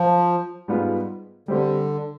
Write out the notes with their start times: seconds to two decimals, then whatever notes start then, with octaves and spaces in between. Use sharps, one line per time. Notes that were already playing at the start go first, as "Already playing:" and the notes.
Already playing: F3
0.68 G#2 G3 B3 F4 G#4
1.48 D3 G3 C4 G4